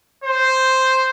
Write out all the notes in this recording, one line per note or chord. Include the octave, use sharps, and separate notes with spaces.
C5